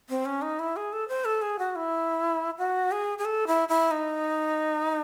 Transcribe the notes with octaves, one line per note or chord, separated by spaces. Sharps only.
C4
C#4
D#4
E4
G#4
A4
C5
A4
G#4
F#4
E4
F#4
G#4
G#4
A4
E4
E4
D#4